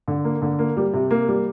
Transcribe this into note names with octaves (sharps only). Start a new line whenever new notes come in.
D3
A#3
D3
A#3
G3
C3
A#3
G3